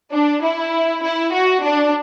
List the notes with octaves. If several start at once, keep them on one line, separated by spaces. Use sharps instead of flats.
D4
E4
E4
F#4
D4